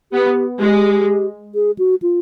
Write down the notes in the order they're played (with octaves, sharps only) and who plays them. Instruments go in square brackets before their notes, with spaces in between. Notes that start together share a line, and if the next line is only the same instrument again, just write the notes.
[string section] B3 [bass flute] G4
[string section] G#3 [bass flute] G4
[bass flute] G#4
F#4
F4